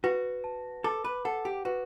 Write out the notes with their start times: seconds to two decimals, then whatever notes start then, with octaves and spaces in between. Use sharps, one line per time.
0.04 F#4 B4
0.44 A5
0.84 A4 D6
1.04 B4
1.25 A4 F#5
1.45 G4
1.65 F#4 B4